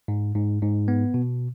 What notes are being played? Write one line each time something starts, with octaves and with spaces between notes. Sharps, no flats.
G#2
G#2
G#2
B3
B2